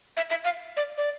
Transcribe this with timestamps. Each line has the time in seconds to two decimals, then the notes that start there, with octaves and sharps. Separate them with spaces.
0.17 E5
0.30 E5
0.45 F5
0.77 D5
0.98 D5